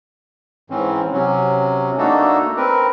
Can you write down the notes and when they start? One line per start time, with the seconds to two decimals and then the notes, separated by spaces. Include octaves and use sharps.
0.70 G#2 E3 C4 C#4
1.13 C3 F#3 C#4
1.98 A3 A#3 D4 D#4 F#4 A4
2.57 C4 A#4 B4